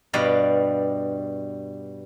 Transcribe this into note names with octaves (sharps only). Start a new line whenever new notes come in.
G2 B2 G3 D5 F5